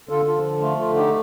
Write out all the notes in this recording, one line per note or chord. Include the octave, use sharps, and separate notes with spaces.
D3 F4 A4
F4 A4
F3
A3 F4
F4
D3
D#4 G4